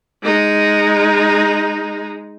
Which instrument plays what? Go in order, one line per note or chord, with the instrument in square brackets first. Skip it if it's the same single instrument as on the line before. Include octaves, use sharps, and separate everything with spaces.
[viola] G#3 D#4